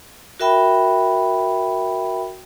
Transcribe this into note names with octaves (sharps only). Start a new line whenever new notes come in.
F#4 A#4 E5 G5 B5